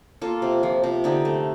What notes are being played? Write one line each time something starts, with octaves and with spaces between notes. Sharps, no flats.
A#3 F4 A4
C3
F3
C3
D3 D#4 G4
A3